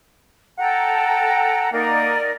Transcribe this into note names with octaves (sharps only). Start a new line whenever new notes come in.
A4 F#5 G5 A#5
A#3 D#4 A#4 D5